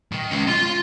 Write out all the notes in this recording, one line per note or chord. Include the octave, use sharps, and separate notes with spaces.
D#3
G#3 C#4
F4 C6